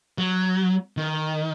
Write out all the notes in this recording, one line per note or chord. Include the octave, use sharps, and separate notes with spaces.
F#3
D#3